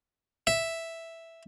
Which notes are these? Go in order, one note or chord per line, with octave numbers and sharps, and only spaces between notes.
E5